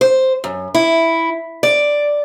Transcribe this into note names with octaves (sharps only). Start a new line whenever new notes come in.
C5
F#2
E4
D5